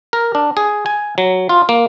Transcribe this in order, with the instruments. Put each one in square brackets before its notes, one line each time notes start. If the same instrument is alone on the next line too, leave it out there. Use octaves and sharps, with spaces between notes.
[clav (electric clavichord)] A#4
D4
G#4
G#5
F#3
F4
A#3